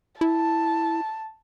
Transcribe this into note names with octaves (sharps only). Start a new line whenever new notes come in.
E4 A5